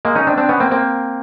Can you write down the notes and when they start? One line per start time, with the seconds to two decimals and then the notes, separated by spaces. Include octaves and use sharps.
0.05 G#3 A#3
0.15 C#4 D#4
0.27 C4 D4
0.38 C4 D4
0.49 B3 C#4
0.60 A#3 C4
0.71 A#3 C4